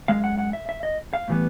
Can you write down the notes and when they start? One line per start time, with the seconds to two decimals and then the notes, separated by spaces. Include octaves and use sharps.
0.08 F#2 D#3 G#3 F5
0.24 F#5
0.38 F#5
0.53 E5
0.69 E5
0.83 D#5
1.13 F5
1.28 A2 E3 G3 B3